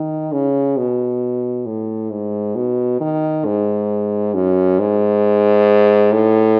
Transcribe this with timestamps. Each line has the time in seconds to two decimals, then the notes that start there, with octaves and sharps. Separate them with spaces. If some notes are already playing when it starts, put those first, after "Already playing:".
Already playing: D#3
0.32 C#3
0.77 B2
1.66 A2
2.10 G#2
2.55 B2
3.00 D#3
3.45 G#2
4.34 F#2
4.79 G#2
6.12 A2